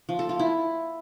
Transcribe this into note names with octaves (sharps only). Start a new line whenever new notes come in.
F3
A4
F4
E4